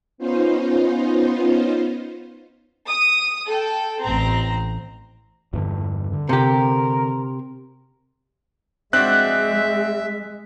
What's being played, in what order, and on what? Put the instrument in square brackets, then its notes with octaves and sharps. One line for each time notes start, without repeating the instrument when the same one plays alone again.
[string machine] B3 C#4 D#4 F4 C5
[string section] D#6
A4 G5
A1 C4 A#5
[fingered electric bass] E2 G2 D3
D3
[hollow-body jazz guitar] C3 G4 [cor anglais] A#4
[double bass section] G#3 [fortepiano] C4 D4 F#4 [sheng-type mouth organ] E5 [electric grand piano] F#6